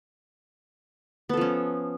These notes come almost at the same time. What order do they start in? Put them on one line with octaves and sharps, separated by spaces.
B3 A4 F3 C#4